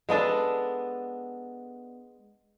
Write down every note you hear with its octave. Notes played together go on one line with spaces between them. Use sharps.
G#3 B3 D4 A4